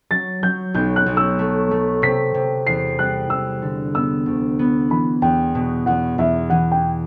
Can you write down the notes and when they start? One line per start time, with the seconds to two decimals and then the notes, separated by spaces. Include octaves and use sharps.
0.10 F#3 A6
0.43 F#3 G6
0.74 B1 G6
0.96 F#6
1.06 B1
1.17 E6
1.39 A3
1.71 A3
2.02 C3 B6
2.34 C3
2.67 E2 C7
2.99 G3 F#6
3.30 E2 E6
3.62 D3
3.95 B3 E6
4.26 D2
4.59 B3
4.90 E3 B5
5.22 E2 G5
5.55 B2
5.86 E2 F#5
6.18 E2 E5
6.50 E3 F#5
6.72 G5